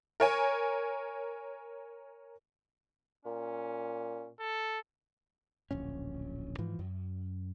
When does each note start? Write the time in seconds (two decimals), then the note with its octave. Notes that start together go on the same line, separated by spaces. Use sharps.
0.20 A#4 C#5 G#5
3.25 A#2 C#4
4.39 A4
5.71 D1 A#1 C#4
6.58 G#2 E3 F3
6.79 F#2